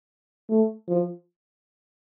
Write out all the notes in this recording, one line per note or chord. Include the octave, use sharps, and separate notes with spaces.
A3
F3